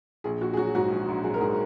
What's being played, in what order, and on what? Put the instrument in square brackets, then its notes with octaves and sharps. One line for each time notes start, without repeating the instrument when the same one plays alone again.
[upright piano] A#1 G#4
A#1 F#4
G#4
F#3 F#4
G#2 F#4
A#1
A#1
F#3 G#4
A#4
G#2 G#4